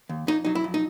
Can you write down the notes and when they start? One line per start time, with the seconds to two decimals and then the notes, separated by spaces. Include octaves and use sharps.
0.09 D#2
0.27 F2 D#4
0.45 F#3 D#4
0.55 E4
0.64 F2
0.74 D#4